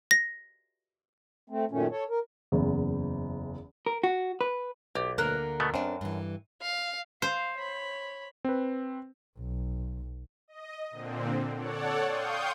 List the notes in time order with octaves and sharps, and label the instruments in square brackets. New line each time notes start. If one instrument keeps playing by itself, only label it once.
[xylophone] A#6
[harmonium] A3 C4
F#2 A#2 D#3 A3 C#4
A4 C#5
A#4
[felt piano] F#1 E2
[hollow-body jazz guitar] A#4
F#4
B4
[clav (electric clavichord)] B1 [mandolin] G4
[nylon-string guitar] D2 D3 A#3 [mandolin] A#4 F#6
[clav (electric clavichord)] B2 A3 B3
[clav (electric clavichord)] F#2 [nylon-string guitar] C4 D4
[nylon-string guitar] G2 E3
[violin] F5
[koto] C5 [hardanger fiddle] F5
[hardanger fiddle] C#5 B5
[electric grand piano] C4 B4
[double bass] B1
[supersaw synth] D#5
A#2 D3 C4
A4 C#5 D5 F#5
F5 G5 C6 C#6 D#6 G6